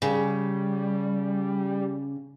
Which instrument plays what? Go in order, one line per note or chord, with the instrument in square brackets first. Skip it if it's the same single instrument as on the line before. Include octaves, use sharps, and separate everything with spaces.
[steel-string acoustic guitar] C#3 [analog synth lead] G3